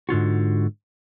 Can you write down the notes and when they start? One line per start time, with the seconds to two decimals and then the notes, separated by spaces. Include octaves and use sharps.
0.09 G#2 D3 F4 F#4